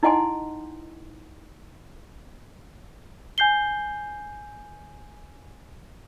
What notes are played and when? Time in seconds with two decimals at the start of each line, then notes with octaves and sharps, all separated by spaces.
0.03 D#4 E4 D#5 F#5 G#5 C6
3.38 G#5 G6 C7 G7